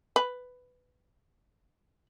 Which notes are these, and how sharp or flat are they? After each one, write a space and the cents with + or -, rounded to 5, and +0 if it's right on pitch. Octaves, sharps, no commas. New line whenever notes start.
B4 +10